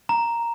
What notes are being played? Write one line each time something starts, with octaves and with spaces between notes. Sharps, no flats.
A#5